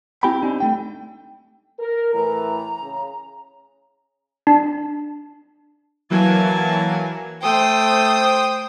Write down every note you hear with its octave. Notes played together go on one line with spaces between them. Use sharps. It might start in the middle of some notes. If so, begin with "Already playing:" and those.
C4 E4 G4 G5 G#5 B5
C4 D4 D#4
A3 G5
A#4
A2 E3 A#5
C#3
D4
E3 F#3 A#3 G#5 A5
A3 C5 G5 D#6